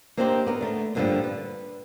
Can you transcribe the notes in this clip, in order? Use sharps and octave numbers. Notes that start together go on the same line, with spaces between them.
A#3 C4 D4 D#4 G4 C5
B3 A#4
D3 A3
G2 A#2 D3 D#3 F3 G3
B4